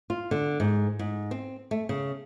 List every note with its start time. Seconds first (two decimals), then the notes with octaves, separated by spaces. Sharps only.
0.10 F4
0.31 D3
0.60 G#2
0.99 G#2
1.31 C4
1.71 A3
1.89 C#3